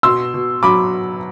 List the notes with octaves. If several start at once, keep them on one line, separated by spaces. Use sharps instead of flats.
B2 C6 E6
B2
F#3 B5 D6